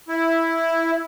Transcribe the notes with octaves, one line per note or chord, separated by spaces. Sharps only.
E4